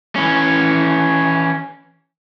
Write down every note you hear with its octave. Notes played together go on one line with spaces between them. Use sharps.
E3 C#4